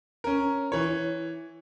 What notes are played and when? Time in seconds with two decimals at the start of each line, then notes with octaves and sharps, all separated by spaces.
0.24 C#4 A#4
0.72 E3 C#5